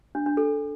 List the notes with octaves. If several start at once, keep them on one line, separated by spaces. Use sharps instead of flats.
D4
D4
A4